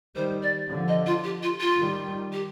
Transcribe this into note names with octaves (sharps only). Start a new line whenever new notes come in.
D#3 G3 C5
D5
D3 F3
D#5
F4
G4
F4
F4
D#3 G3
G4